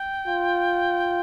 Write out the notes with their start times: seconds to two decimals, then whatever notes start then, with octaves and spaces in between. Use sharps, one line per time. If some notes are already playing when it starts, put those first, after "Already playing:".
Already playing: G5
0.28 F4